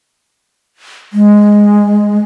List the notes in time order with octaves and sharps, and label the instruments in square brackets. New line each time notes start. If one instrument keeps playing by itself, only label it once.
[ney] G#3